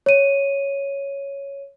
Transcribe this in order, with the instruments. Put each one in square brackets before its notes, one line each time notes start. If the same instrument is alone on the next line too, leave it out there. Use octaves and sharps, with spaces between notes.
[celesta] C#5 D#7